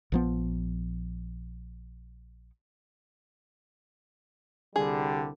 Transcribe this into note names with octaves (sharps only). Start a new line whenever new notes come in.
A#1 F3 B3
C2 D3 G3 G#4